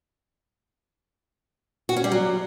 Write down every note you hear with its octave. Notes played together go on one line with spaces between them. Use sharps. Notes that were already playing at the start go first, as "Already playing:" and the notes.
F#4
C#4
G3
F#3